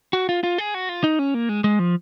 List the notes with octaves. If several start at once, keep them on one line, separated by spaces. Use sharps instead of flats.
F#4
F4
F4
G#4
F#4
F4
D#4
C#4
A#3
G#3
G#3
F3